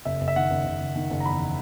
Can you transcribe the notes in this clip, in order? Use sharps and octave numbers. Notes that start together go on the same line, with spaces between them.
F#1 E5
F#1
E5
D#3 F#5
F#1
F#1
F#1
D#3
F#1
A#5
E2 B5